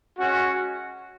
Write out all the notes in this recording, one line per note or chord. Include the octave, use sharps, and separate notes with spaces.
G#3 C#4 F#4